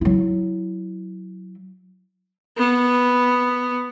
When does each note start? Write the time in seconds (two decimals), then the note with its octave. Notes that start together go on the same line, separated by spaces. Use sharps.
0.01 F#3 E4
2.57 B3